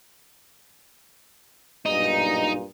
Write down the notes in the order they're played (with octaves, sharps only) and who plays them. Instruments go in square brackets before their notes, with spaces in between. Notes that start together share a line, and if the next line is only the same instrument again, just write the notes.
[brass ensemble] B1 G2 A#2 [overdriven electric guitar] D#4